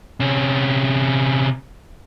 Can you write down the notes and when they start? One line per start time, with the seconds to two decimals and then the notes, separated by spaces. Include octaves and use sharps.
0.20 C3 C#4